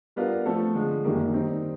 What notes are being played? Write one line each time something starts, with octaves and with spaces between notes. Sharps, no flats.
G3 B3 D4 F4 A#4
F3 A3 C4 F4 A4
D3 F3 G#3
F#2 D#3 G3 A#3
D#3 G3 C4 D#4